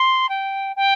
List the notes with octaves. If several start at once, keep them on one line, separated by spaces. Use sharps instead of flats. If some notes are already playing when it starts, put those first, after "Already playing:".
Already playing: C6
G5
G5